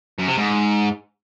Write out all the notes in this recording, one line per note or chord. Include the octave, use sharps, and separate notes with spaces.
F#2
C3
G#2